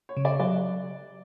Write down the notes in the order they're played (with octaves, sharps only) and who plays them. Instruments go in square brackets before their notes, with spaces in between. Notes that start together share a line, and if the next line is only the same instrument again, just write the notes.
[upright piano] C#5
[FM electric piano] C#3
[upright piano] D5
[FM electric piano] F#3 [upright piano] D5